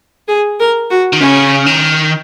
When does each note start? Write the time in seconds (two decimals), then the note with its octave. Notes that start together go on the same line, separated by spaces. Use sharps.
0.28 G#4
0.60 A#4
0.90 F#4
1.13 D#3
1.20 C#3 C#4
1.66 D#3